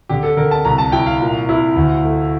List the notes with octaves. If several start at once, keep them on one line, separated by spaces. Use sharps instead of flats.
D3 G4
A4
D3 A#4
A5
C2 A#5
A5
E4 G5
F5
A#2
E4
D2
A3